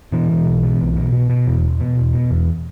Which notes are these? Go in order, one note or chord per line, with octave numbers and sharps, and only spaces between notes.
B2 E3
B2
B1
B2
B1
B2
B2
B2
E2
E1
B2
E1
B2
E2